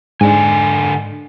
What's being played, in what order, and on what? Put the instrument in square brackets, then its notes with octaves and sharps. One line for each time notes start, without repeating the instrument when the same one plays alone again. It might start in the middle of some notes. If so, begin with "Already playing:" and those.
[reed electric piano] G#2 D4 [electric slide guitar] D3 D#5 G#5